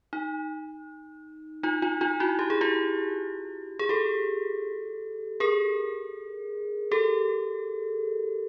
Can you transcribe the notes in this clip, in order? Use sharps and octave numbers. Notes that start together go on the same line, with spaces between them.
D#4
D#4 F4
D#4 F4
D#4 F4
E4 F#4
G4
G#4
F4 G4
G#4
G4 A4
G#4 A#4
G4 A4